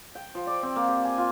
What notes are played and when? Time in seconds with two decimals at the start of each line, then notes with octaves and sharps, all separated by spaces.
0.15 G5
0.35 F3
0.47 D5
0.63 C4
0.76 A#3
0.88 G4
1.04 G#5
1.18 F4